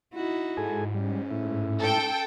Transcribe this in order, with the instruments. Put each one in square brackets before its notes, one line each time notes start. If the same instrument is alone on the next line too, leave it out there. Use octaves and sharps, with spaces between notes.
[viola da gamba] D#4 E4 F#4
[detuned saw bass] G#2 [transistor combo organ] G#4 A4 G#5
[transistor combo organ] G3 [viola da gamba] C#4
[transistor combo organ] A2 E4
[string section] A4 G5